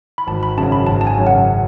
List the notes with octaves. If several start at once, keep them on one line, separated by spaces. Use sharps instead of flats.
B5
G#1 A5
B5
F#2 C#3 F#3 A5
B5
G#1 A5
A5
G#5
F#2 C#3 F#3
F#5